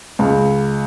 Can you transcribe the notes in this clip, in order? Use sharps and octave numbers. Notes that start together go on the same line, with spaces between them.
C#2